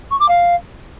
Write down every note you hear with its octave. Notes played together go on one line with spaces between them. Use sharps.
C#6
D6
F5